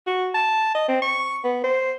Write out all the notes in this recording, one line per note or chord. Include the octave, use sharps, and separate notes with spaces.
F#4
A5
D#5
C4
C#6
B3
C5